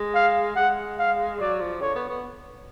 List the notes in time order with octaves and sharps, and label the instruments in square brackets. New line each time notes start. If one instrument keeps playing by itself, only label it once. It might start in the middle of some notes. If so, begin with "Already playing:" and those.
Already playing: [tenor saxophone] G#3
[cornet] F5
[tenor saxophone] G#3 [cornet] F#5
[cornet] F5
[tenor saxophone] F#3 [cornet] D5
[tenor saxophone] F3
[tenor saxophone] D3 [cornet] C#5
[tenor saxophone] B3
B3